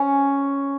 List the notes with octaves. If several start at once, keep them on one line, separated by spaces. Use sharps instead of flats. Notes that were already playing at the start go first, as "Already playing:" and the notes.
Already playing: C#4